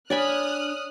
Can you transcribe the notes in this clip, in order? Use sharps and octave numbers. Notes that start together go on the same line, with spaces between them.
D4 C#5 D5 G#5 B5 D#6 F6 F#6